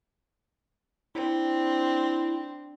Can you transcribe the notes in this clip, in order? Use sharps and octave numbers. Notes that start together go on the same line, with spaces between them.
C4 D4 E4